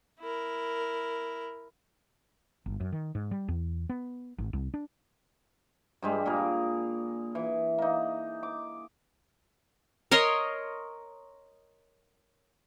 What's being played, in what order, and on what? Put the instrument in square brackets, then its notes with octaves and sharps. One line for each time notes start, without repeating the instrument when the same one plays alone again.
[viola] E4 A#4
[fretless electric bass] G1
F#2
D#3
G#2
G3
E2
B3
G#1
C2
D4
[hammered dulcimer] G2 G3 G#3
A#2 G#4 A#4
E3
A#3 D#4
D6
[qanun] A#4 C#5 D#5 C6